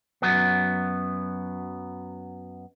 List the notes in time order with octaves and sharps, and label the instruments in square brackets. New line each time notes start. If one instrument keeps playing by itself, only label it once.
[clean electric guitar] F#2 F#3 B3